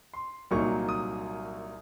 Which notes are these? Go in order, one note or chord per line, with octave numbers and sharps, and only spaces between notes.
C6
C2 A#2 F#3 A#3 D#4 C#6
D#6